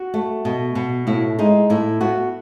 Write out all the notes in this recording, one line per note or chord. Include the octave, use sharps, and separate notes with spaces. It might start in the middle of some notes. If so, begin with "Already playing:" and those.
Already playing: F#4
A3
B2
B2
A2 E4
G#3 D#4
A2 E4
B3 F#4